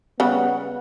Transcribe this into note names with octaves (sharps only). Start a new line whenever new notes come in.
C#3 G3 B3 F#5